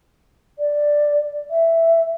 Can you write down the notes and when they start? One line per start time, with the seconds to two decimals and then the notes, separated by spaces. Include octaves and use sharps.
0.59 D5
1.51 E5